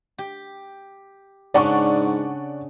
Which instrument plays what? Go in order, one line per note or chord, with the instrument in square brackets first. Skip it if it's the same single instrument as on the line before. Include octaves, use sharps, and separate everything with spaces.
[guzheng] G4
[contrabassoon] G#2 [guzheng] C#3 C#4 D4 [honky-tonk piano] D5 F#5 C#6